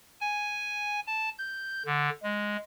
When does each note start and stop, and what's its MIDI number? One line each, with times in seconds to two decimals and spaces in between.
0.21 1.00 80
1.07 1.29 81
1.38 1.83 91
1.86 2.10 50
2.23 2.57 56